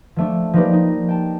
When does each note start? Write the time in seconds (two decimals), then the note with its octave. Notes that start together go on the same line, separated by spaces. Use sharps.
0.16 F3 A3 D4
0.53 F3 A#3 D#4 G4 B4 D5
0.73 D#4
1.09 G5 A5